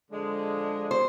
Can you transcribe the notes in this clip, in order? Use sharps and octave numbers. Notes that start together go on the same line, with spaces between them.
D3 F3 G#3
C5